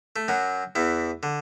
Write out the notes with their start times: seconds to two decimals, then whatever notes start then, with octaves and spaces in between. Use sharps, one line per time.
0.16 A3
0.28 F#2 F#3
0.75 E2 E3
1.23 D3